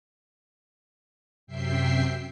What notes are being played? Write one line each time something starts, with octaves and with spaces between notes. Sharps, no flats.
F#2 C3 E5 G5 C7